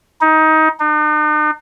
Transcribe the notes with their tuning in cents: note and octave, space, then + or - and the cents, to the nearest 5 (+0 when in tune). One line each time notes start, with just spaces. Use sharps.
D#4 +20
D#4 -45